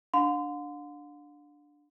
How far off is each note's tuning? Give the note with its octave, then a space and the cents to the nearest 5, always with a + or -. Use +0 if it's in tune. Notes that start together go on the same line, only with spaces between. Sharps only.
D4 +0 F5 +45 C6 -30